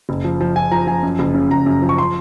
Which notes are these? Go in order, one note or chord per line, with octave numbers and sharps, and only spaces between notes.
F#1
F3
F3
F3 G#5
F3 A#5
F3 G#5
F#2
F#1
C#3
F#1 A#5
F#2
F3
C#6
C6